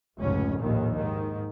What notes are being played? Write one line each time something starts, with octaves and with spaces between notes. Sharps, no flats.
F1 C#2 G#2 C#4
A#1 D#2 A2 D#3
G#2 D#3